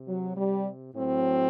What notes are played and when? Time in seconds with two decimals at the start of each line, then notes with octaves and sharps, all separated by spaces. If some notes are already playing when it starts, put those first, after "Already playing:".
Already playing: C3
0.08 F#3
0.37 G3
0.95 A2 F#3 C4